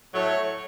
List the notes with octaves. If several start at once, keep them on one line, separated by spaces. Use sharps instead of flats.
A2 F#3 A3 C#5